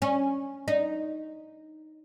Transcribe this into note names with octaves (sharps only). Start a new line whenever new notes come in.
C#4
D#4